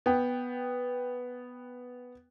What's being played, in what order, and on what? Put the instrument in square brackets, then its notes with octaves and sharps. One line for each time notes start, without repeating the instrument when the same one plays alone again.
[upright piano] B3 G5